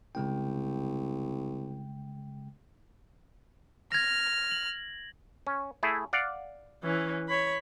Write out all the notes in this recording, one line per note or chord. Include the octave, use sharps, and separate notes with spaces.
C2 C#3 G#3 G5
F6 G#6 A#6
F#7
C#4
A3 E4 G#4
D5 F5 F#5
E3 C#4
C#5 B5